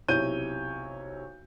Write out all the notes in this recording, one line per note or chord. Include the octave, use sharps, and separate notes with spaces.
B1 C3 E4 C#5 G6 D#7